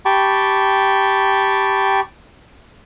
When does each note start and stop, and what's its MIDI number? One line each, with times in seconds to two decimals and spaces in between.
0.05 2.00 67
0.05 2.00 79
0.05 2.00 81
0.05 2.00 83
0.05 2.00 85